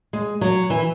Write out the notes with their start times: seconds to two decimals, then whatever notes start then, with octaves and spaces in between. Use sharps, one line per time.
0.13 G#3
0.41 F#3
0.70 E3